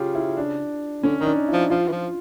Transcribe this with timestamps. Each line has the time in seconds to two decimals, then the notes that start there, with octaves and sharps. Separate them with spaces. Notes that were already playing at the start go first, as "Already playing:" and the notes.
Already playing: C#3 F4 G4
0.15 E4
0.37 D4
1.03 D3 C#4
1.20 D#3 D#4
1.26 D4
1.48 E4
1.53 F3
1.70 F3 F4
1.88 E3
1.92 F3